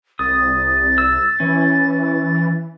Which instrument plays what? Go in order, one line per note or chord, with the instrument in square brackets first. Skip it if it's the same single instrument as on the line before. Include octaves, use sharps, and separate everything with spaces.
[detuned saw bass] C2 [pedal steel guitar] D#6 [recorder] A6
[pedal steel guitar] E6
[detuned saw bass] E3 [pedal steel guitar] C#4